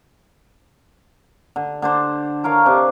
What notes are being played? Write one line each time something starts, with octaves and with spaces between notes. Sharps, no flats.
D3
D3 D4 C5
A4 A#4 C#5 F5
C3 D4